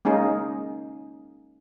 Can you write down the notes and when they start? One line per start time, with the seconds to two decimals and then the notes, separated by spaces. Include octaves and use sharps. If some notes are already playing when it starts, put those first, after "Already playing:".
0.05 G#3 A#3 C#4 D#4 G#4